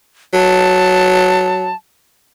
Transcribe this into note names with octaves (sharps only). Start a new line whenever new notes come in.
F#3 A5